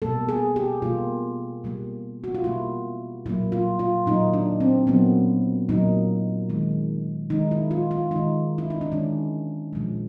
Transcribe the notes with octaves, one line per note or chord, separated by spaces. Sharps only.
B2 G3 A#3 A4
G#4
G4
B2 G3 A#3 F4
B2 G3 A#3
F#4
F4
B2 G3 A#3 E4
A#2 F#3 A#3 E4
F4
F4
A#2 F#3 A#3 D#4
D4
C4
A#2 F#3 A#3 B3
A#2 F#3 A#3 D#4
D#3 G#3
D#3 G#3 D#4
E4
F4
F4
D#3 G#3 D#4
E4
D#4
D4
D#3 G#3 C#4
A#2 F3 G#3